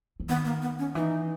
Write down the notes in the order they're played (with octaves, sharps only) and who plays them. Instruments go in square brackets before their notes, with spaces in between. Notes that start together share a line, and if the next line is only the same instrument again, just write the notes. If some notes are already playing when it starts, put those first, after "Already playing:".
[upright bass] E3
[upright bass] D#3 [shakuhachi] B3
[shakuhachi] A#3
B3
C#4
[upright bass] E3 [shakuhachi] D#4